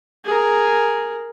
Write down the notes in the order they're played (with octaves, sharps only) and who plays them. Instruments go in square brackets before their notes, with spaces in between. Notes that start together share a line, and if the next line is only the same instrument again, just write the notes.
[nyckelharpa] G#4 A#4